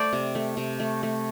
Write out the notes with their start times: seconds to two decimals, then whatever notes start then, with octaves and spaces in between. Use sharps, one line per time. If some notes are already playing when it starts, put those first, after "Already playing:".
Already playing: A3 C5 D5
0.13 C3
0.35 A3
0.57 C3
0.80 A3
1.03 A3